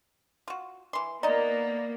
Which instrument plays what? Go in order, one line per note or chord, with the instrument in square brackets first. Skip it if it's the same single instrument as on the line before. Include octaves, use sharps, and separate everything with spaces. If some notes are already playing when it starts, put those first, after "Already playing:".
[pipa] F4 F#4
E3 C6
[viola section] A#3 B3 [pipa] D#4 D#5 [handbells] D5 A#5